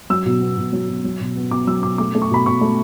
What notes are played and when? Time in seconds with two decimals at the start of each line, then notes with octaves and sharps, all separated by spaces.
0.10 F#3 E6
0.26 B2
0.41 B3
0.58 B2
0.73 F#3
0.89 B2
1.04 F#3
1.21 B2
1.36 B3
1.51 B2 D6
1.67 F#3 E6
1.83 B2 D6
1.98 A3 D6
2.15 A3
2.22 C#6
2.31 B2 B5
2.46 B2 C#6
2.61 A3